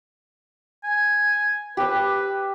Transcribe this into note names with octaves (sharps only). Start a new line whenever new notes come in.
G#5
G4 B4 E6